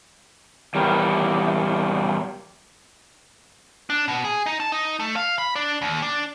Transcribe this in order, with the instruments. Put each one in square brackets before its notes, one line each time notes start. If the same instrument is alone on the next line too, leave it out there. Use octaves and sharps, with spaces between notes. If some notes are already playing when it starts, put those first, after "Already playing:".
[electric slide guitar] E2 G3 A#4
[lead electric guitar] D4
B2
G#4
D#4
A5
D#4
A3
F5
B5
D4
D#2
D4